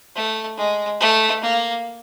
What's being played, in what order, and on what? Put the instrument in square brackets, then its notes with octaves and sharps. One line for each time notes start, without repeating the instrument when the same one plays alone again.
[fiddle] A3
G#3
A3
A#3